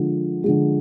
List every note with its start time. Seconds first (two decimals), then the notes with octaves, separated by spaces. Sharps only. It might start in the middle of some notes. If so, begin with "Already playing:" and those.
Already playing: D3 F3 G#3
0.44 D3 F3 G#3